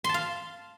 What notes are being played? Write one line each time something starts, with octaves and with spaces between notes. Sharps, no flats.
F5 A5 C6